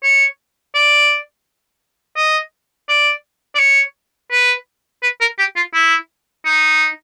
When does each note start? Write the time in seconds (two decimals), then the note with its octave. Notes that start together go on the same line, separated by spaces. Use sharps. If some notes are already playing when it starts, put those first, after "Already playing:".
0.03 C#5
0.75 D5
2.16 D#5
2.89 D5
3.55 D5
3.59 C#5
4.31 B4
5.02 B4
5.21 A#4
5.39 G4
5.56 F4
5.74 E4
6.45 D#4